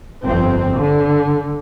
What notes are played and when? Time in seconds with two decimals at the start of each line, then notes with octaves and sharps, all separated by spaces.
0.24 G1 F2 C4
0.77 D3